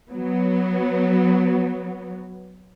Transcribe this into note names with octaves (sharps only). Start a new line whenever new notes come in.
F#3 B3